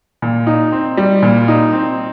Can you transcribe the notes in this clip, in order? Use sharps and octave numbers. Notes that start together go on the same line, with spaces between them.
A#2
D#4
C4
G3
A#2
D#4
C4